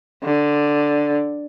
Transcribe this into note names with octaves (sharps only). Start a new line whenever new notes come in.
D3